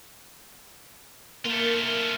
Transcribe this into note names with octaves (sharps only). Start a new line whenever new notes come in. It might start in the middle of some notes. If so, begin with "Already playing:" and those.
A3 A#3 F4